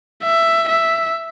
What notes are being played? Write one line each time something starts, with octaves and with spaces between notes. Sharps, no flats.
E5
E5